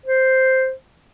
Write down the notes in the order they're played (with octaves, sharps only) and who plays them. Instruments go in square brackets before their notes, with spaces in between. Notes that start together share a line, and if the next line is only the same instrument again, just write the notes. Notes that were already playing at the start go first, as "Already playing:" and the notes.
[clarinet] C5